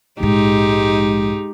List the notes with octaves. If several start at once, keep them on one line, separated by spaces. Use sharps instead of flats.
A#1 G#2 G#3 D#4 G4